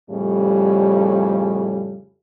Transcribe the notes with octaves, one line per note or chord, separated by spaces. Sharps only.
F2 A2 C#3 G3